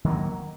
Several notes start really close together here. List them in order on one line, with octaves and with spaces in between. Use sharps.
D#3 F#3 A#3